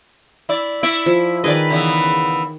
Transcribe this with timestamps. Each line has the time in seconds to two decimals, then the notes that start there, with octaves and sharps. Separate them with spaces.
0.49 E4 D5
0.83 E4 D5 B5 C#6
1.06 F3
1.44 D#3 G#4 B4 D5 D#5
1.70 C#3 E3 B3